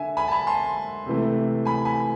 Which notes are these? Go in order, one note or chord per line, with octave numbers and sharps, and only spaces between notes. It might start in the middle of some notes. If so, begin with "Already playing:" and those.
Already playing: D3 E5 G#5
G#5 B5
A5
G#5 B5
A5 C6
C3 E3 A3
G#5 B5
G#5 B5